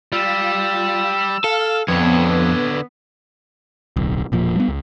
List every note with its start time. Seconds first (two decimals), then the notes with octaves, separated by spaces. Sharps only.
0.12 G3 F4 E6
1.44 A4 F5
1.88 F2 D3 B3 C#5
3.96 D1 B1
4.32 E1 A#2 F3
4.56 G3 B3
4.68 C#2